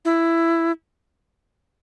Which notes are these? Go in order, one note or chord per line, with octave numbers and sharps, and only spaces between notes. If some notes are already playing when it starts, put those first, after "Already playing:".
E4